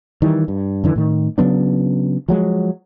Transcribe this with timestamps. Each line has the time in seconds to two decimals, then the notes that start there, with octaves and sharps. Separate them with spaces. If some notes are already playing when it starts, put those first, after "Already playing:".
0.22 D#3 E3 G3
0.48 G2
0.84 F#2 D3 E3
0.96 A2 D#3
1.38 C#3 F#3 B3 D4
2.28 F3 F#3 G#3